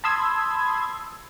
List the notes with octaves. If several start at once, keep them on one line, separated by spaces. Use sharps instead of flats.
A5 B5 C6 D#6 E6 G#6